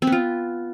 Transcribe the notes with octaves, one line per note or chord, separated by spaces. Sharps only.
C4
B3
F4